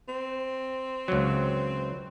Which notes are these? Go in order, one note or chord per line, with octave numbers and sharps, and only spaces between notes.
C4
C#2 F#3